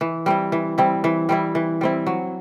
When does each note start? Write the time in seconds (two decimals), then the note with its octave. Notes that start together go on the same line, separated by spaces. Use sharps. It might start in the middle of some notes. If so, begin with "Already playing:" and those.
0.01 E3
0.26 G3 C4 E4
0.52 E3
0.78 G3 C4 E4
1.04 E3
1.29 G3 C4 E4
1.55 E3
1.81 G3 C4 E4
2.07 F#3